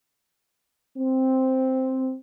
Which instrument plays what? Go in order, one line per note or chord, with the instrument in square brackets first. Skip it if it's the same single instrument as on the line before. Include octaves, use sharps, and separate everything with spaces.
[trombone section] C4